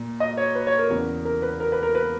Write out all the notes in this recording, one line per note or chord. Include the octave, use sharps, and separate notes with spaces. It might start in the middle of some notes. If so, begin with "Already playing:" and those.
Already playing: A#2
D#5
C#5
B4
C#5
A#4
E2 C#3 E3
A#4
B4
A#4
B4
A#4
B4